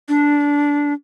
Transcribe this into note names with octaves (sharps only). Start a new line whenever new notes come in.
D4